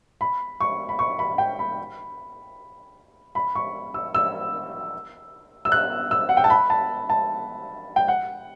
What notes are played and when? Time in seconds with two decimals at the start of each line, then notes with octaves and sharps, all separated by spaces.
0.21 B5
0.60 C#6
0.89 B5
0.99 C#6
1.19 B5
1.38 G5
1.59 B5
3.35 B5
3.55 C#6
3.94 E6
4.15 E6
5.65 E6
5.72 F#6
6.11 E6
6.29 F#5
6.37 G5
6.44 A5
6.50 B5
6.70 A5
7.10 A5
7.96 G5
8.08 F#5